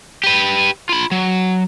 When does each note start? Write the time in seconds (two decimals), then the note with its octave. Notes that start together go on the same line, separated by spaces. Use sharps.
0.23 G4 B4
0.89 F4 B5
1.11 F#3